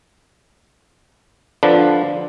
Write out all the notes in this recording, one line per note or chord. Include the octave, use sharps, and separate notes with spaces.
D3 F3 D4 B4